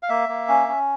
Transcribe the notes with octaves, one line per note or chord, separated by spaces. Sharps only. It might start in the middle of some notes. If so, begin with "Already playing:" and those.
F5
A#3 E5
A#3
C#4
C#4